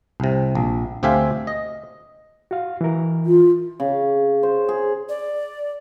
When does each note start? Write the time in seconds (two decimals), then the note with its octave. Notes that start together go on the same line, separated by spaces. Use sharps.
0.20 C2 C3
0.55 A#1
1.03 D2 C4 G4 E5 F5 G#5
1.47 D#5
2.51 F#4 F5
2.81 E3 A#4
3.26 F4
3.80 C#3
4.43 C5
4.68 G#4
5.09 D5